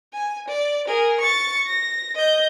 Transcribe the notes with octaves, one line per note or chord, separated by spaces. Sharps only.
G#5
D5
G#4 A#4
C#6 A6
A#6
D#5 G6